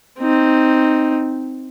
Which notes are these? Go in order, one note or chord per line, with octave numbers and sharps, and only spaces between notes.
C4 D#4